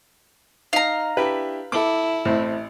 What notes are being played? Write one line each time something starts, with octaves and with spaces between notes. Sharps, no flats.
D#4 F5 A#5
D4 E4 G4 B4
E4 A4 D6
A1 A2 C4